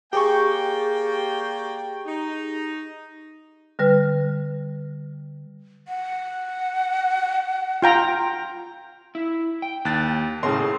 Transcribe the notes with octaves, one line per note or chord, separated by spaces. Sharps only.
A#3 G4 G#4 D5 G5 C#6
D#4
D3 G3 B4 F6
F#5
F4 G5 A#5
E4
G5
D#2 F#6 A6
A2 C#3 G#4 A#4 C6